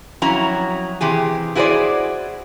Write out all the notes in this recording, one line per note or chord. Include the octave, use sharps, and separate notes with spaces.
F2 F#3 C#4 E4 F#4 A#5
C3 E3 G4 G#4
E4 F#4 G#4 A4 C5 D5